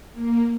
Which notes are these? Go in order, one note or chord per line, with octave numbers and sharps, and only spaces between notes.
A#3